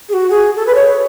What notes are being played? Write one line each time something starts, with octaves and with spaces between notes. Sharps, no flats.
G#4
F#4
G#4
A4
B4
C#5